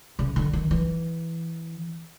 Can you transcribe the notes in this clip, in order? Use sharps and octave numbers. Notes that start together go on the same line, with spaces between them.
C#3
D3
D#3
E3